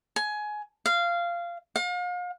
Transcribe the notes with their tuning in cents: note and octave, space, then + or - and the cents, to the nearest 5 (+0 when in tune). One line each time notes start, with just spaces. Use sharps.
G#5 +20
F5 -15
F5 +40